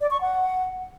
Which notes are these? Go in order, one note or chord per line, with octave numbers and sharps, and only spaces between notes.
D5
C#6
F#5